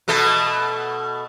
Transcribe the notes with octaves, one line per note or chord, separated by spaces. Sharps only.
B2 A3 A4